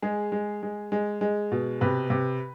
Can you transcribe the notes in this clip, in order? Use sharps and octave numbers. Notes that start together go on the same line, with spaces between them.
G#3 G#4
G#3
G#3
G#3
G#3
B2
C3 B4
C3